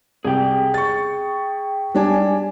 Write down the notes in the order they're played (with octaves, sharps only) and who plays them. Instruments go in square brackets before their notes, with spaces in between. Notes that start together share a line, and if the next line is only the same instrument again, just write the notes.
[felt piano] C2 [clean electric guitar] G#4 G5
[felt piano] C#6 A6
G3 D4 G#5